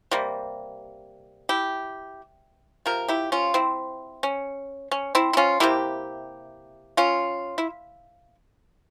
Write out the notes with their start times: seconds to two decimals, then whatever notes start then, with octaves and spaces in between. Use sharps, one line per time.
0.11 C3 G3 A#3
1.49 E4 G4
2.86 C3 F3 A#4
3.08 E4 G4
3.32 C#4 F4
3.54 C4 E4
4.23 C#4
4.91 C#4
5.15 C4 E4
5.33 E4
5.37 C#4 F4
5.60 C3 G3 A#3 E4 G4
6.97 C#4 F4
7.58 E4